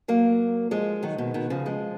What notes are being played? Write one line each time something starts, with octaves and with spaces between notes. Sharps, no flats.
F#3 A#3
F3 G#3
D#3 F#3
B2 D#3
B2 D#3
C#3 F3
F3 G#3